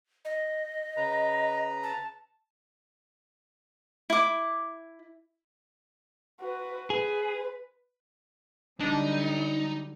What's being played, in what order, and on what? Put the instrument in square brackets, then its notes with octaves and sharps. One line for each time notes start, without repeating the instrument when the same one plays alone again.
[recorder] D#5
[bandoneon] C#3 B4 A#5
[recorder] A5
[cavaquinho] E4 D6
[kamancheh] F#4 B4
[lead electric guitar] G#4 [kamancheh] B4
[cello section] D3 F#3 G3 [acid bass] D4 [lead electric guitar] D#4